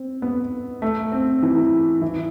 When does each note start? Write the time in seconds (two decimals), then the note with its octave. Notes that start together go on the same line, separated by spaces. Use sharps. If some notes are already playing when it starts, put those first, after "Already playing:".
Already playing: C4
0.22 B3
0.82 A3
1.12 C4
1.43 E3
2.02 E3